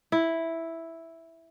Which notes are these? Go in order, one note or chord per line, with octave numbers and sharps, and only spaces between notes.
E4